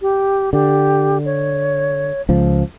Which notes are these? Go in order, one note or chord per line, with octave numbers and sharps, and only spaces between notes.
G4
D3 G4
C#5
C#2 F3